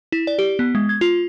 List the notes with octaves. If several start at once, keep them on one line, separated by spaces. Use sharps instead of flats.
E4
D5
G4
B3
G#3
G#6
F4